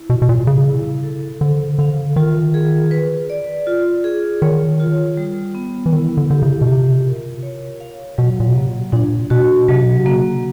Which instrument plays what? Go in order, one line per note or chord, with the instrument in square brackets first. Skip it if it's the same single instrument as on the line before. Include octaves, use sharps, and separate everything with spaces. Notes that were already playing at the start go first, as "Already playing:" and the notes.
Already playing: [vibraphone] E4
[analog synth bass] B2
B2
[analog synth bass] A#2 [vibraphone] G3
[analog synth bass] C#3
[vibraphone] E4
A4
[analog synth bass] D3 [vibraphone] C5
[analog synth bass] D3 [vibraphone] F5
[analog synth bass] D#3 [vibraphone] F4
[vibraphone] G#4
B4
D5
F4
G#4
[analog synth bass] D#3 [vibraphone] C#5
[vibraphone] F4
G3
B3
[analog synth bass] E3
[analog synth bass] D#3 [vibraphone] E4
[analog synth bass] D3
[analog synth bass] D3 [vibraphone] G4
[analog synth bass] C#3
B2
[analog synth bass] C3 [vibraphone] F4
[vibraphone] A#4
C#5
F5
[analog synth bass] B2 [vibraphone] F#3
[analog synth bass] A#2
B2
[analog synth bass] C3 [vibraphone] A#3
[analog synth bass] A#2 [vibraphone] D4
[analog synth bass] B2 [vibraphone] F#4
[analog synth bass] C3 [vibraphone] F#3
[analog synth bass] B2
C3
[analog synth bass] C#3 [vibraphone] A#3